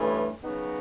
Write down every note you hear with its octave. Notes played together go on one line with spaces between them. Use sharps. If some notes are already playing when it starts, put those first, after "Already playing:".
Already playing: G2 E3 A3 C#4
C#3 F#3 B3 D#4 F#4